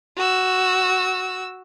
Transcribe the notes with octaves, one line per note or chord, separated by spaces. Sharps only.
F#4 E6